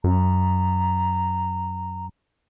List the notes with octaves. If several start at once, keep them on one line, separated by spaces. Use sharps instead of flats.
F#2 A#5